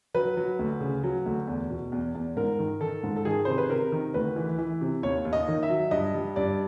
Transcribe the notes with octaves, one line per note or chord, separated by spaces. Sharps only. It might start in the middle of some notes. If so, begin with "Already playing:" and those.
F#3 B4
F#3
D2
C#3
F#3
D2
E2
B2
E2
E2
G#2 A#4
D#3
D#3 A4
G#2
A4
D#3 G#4
C3 C5
B4
C3 A#4
D#3
D2 B4
E3
E3
C3
D#2 C#5
D#2
D#5
D#3
E5
F#3
G2 D#5
G3
G2 D5